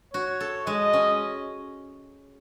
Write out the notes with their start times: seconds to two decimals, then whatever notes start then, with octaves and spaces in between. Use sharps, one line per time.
0.14 F#4 C#5
0.40 A4
0.66 G#3 D#5
0.93 C#4